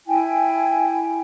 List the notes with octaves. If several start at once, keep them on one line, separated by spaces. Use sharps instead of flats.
E4 G5 G#5